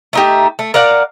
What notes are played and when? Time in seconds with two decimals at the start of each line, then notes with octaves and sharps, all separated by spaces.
0.13 A3 D#4 G4
0.59 A3
0.74 A#4 D5 F5 F#5